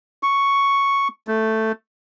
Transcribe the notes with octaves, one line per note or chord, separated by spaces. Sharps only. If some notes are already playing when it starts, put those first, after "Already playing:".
C#6
A3